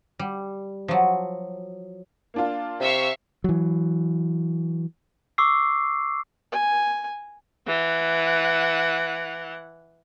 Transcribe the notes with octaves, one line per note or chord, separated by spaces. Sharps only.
G3
F3 F#3
A#3 D4 F4
C3 E5 F5 C#6
E3 F#3
C#6 D6 E6 C7
G#5
E3 F#5